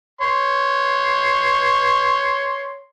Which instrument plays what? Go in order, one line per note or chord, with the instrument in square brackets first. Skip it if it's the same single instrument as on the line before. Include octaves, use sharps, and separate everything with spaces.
[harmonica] C#5 C6